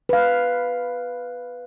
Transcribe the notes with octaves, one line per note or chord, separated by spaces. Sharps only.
B4 F5